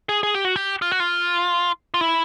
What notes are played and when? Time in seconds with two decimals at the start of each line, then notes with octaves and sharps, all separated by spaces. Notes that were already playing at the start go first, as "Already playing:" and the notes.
0.09 G#4
0.23 G#4
0.34 G4
0.45 F#4
0.56 G4
0.82 F4
0.91 F#4
1.00 F4
1.94 F4
2.01 E4